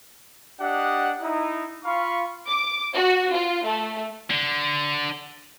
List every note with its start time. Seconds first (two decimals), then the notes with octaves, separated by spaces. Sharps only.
0.61 D4 G4 D#5 F#5
1.21 D#4 E4
1.85 F4 F5 B5 C#6
2.48 D6
2.94 F#4
3.32 F4
3.64 A3
4.31 D3